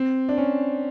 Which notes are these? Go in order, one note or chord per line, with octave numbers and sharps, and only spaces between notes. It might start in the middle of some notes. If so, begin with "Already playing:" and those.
Already playing: C4
D4
C#4